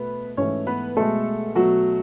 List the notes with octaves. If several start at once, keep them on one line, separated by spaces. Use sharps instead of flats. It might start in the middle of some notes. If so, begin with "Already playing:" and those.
Already playing: B2 A3 B3 B4
G#2 E3 A3 C#4 C#5
B3 B4
B2 G#3 A3 A4
B2 F#3 A3 F#4